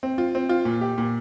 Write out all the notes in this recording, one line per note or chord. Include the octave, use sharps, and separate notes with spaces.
C4
F4
C4
F4
A#2
G4
A#2